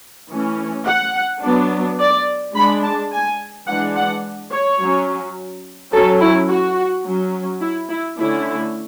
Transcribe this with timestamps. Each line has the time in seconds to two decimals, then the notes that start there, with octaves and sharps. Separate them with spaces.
0.30 E3 A3 C#4
0.86 F#5
1.42 F#3 B3 D4
1.99 D5
2.55 G#3 D4 B5
2.83 A5
3.12 G#5
3.67 E3 G#3 D4 F#5
3.96 F#5
4.51 C#5
4.80 F#3 C#4
5.93 F#3 C#4 A4
6.21 E4
6.49 F#4
7.05 F#3 C#4
7.61 E4
7.89 E4
8.18 D3 A3 C#4 E4